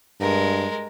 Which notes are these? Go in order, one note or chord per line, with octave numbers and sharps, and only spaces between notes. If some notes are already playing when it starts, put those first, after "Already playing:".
G2 G#3 A#4